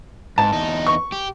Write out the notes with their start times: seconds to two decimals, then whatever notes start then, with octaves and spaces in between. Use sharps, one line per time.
0.38 G#2 A5
0.53 E2 D#4
0.87 C#6
1.12 G4